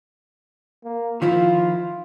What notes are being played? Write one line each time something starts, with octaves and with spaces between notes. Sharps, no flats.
A#3
D#3 F3 E4 F4